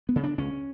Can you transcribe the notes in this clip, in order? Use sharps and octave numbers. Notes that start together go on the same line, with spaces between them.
B3
C#3
D4
C#2 C#4